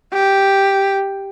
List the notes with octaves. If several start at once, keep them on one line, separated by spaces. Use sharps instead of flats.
G4